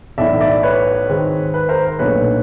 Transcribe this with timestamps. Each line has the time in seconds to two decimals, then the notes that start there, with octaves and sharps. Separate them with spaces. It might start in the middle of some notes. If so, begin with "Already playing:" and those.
0.18 B1 A2 E3 D5 E5
0.41 D5 E5
0.63 B4 C#5
1.09 G#2 D#3 G#3 C4
1.54 B4
1.69 A#4 C5
1.99 B1 A#2 F#3 A3 D4 B4 C#5